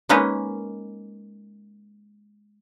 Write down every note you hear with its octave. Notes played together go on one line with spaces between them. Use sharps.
G#3 A#3 C#4 D#4 B4